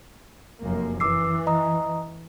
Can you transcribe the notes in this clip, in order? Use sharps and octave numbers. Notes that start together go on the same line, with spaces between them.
F1 F#2 A#3
E3 D6 E6 C7
D#5 A#5 D#6